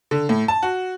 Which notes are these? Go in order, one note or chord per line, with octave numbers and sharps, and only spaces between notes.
D3
A2
A5
F#4